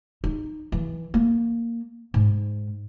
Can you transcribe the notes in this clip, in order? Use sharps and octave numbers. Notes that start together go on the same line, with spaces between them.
D#4
E3
A#3
G#2